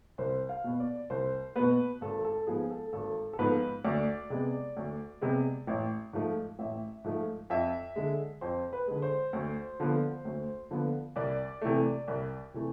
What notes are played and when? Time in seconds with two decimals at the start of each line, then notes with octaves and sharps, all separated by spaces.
0.18 C2 C5
0.49 F5
0.64 B2 B3
0.80 D5
1.10 C2 C5
1.56 B2 B3 B4
2.01 G#1 A4
2.25 A4
2.47 G#2 F3 B3 G#4
2.70 A4
2.93 G#1 A4
3.33 A4
3.39 G#2 F3 B3 B4
3.84 D2 D5
4.30 C3 G#3 B3
4.77 D2
5.21 C3 G#3 B3
5.67 A1
6.13 G#2 F3 A3
6.59 A1 E5
7.04 G#2 F3 A3
7.50 F2 E5
7.96 D3 G#3
8.41 F2 C5
8.73 B4
8.87 D3 G#3
9.02 C5
9.33 D2
9.80 D3 F3 B3
10.25 D2
10.71 D3 F3 B3
11.16 C2 D5
11.62 C3 E3 A3
12.08 C2
12.54 C3 E3 A3